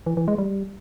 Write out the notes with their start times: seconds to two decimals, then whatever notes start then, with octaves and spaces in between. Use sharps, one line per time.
0.06 E3
0.17 E3
0.28 G#3
0.38 G3